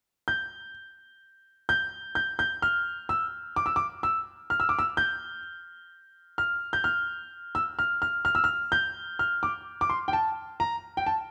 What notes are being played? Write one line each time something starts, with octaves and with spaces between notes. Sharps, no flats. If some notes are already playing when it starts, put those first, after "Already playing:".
G6
G6
G6
G6
F6
E6
D6
E6
D6
E6
F6
E6
D6
E6
G6
F6
G6
F6
E6
F6
F6
F6
E6
F6
G6
F6
D6
D6
C6
G5
A5
A#5
G5
A5